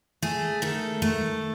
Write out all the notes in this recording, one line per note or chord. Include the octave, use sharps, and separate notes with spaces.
A3 G#4
D#3 A4
A3